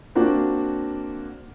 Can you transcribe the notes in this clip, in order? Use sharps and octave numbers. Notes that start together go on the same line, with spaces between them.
A#3 C4 D4 F#4